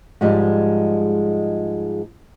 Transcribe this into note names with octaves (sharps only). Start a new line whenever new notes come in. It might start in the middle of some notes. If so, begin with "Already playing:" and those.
G#2 F3 G3 G#3